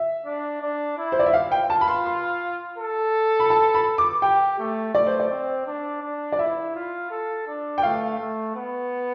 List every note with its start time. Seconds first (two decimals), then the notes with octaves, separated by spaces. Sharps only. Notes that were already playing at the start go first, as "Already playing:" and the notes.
Already playing: E5
0.25 D4
0.61 D4
0.98 E4
1.12 C5
1.19 D5
1.26 E5
1.33 F5
1.52 G5
1.70 F4 A5
1.81 B5
1.88 C6
2.06 C6
2.78 A4
3.40 B5
3.50 A5
3.74 B5
3.98 D6
4.22 G4 G5
4.58 A3
4.94 A3 D5
5.06 C5
5.20 D5
5.30 C4
5.66 D4
6.03 D4
6.32 D5
6.39 E4 E5
6.75 F4
7.11 A4
7.47 D4
7.78 G5
7.83 A3 F5
8.19 A3
8.55 B3